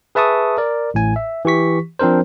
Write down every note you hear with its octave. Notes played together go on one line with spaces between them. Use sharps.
G#4 B4 E5 A5 C#6 D#6
A#4 D5
A1 A2 G#5
E5
E3 G4 C#6 B6
F3 C4 D4 A#4 C5